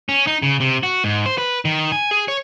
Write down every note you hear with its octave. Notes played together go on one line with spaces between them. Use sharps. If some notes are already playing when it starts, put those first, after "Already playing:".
C#4
D#4
C#3
C3
F#4
G#2
C5
B4
D#3
G#5
G#4
C#5